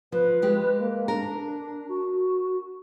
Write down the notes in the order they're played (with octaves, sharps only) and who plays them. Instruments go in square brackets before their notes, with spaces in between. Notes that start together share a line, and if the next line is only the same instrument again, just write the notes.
[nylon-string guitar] F3 [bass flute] B4
[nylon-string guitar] G#3 G4
[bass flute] A#3
[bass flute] D4 [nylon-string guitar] A#4
[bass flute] F#4